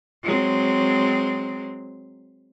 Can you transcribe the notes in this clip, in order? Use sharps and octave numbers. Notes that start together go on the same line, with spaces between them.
F#3 G#3 C4